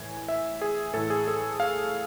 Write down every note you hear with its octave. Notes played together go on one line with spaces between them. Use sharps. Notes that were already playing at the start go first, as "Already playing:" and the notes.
Already playing: A2 E3 G#5
E5
G#4
A2 E3 A4
G#4
A4
F5